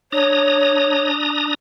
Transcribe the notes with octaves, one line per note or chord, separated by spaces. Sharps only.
D4 C#5 A#5 D#6